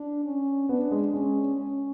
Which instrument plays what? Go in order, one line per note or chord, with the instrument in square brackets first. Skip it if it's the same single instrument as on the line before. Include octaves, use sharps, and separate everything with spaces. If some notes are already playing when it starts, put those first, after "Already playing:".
Already playing: [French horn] D4
C#4
[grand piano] B3 [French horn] D4
[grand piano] G#3
[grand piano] G#3 [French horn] C#4
[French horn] C#4